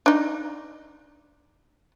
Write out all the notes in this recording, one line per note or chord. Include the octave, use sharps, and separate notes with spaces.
D4 D#4